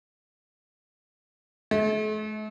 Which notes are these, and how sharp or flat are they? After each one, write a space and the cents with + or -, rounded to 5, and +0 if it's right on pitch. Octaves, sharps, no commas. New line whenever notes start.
A3 -45